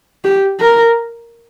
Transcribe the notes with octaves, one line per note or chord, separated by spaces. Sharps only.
G4
A#4